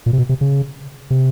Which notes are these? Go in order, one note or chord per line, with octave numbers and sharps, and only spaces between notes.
A#2
C3
B2
C3
C#3
C3